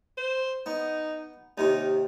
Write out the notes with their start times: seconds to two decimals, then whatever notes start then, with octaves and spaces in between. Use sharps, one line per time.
0.17 C5
0.66 B3 D#4
1.58 D#2 C3 D#3 D#4